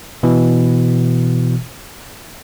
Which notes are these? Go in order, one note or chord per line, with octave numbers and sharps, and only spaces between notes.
B2 E3